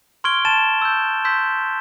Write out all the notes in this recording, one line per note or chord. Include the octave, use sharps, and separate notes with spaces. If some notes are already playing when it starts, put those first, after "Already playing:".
C6 C#6 F6 G#6 D7 G7
A5 A6 E7
E6 G6
C6 E6 G6 B6